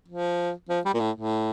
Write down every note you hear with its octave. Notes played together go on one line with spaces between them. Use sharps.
F3
F3
G3
A#2
A2
A2